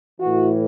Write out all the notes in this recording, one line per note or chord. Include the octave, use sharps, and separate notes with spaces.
A2 E3 F#4